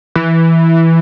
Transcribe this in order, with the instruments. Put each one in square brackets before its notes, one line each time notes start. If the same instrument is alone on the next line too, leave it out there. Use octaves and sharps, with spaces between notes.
[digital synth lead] E3